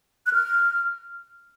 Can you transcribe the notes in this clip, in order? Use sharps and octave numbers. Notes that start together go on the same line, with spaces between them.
F#6
F6